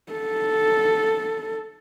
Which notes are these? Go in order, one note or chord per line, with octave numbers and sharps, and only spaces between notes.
A4